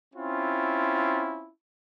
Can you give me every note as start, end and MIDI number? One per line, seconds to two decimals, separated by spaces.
0.15 1.49 60
0.15 1.49 61
0.15 1.49 64
0.15 1.49 65